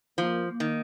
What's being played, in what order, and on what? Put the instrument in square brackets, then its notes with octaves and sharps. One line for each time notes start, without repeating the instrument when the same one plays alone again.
[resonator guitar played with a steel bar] F3 [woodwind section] A#3
[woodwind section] A#3
[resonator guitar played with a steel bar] D#3